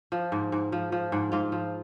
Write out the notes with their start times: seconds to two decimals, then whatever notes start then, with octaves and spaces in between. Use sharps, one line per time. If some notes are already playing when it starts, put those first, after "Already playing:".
0.12 F3
0.32 G#2
0.52 G#2
0.72 F3
0.92 F3
1.12 G#2
1.32 G#2 F4
1.52 F3